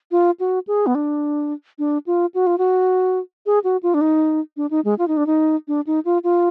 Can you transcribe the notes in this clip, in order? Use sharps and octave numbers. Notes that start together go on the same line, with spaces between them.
F4
F#4
G#4
B3
D4
D4
F4
F#4
F4
F#4
G#4
F#4
F4
D4
D#4
D4
D#4
G#3
F4
D#4
D4
D#4
D4
D#4
F4
F4